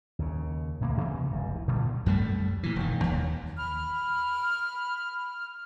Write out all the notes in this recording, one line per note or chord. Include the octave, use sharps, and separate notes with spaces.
D#2 C#3
D2 B2 A3 A#3
C3 E3 A3 B3
F1 C#2 F#2
E3
A#2 D3 G3 B3
F#2 G3 A3
A#2 E3
E1 D#3
D#2
B5 F6